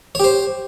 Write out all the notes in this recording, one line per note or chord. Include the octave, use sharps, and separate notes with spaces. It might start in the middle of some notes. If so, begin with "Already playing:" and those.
G4 C5 C#5